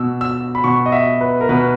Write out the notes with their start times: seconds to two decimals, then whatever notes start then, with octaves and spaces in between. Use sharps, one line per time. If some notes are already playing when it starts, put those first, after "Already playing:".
Already playing: B2 E6
0.21 E6
0.55 B5
0.64 B2 C#6
0.86 D#5
0.92 E5
1.21 B4
1.41 A#4
1.49 B2 B4